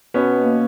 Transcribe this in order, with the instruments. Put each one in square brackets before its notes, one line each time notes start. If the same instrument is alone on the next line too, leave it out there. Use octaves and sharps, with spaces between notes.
[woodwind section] B2 [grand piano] B3 C#4
[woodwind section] A#3